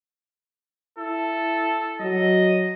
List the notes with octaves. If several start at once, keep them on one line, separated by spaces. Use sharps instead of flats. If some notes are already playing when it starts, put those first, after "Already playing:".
E4 A4
F#3 D#5